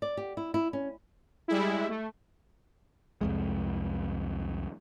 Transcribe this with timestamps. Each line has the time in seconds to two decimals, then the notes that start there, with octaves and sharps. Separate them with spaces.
0.02 D5
0.17 G4
0.37 E4
0.54 E4
0.73 C#4
1.48 G3 G#3 E4
1.89 A3
3.21 C2 F2 G#3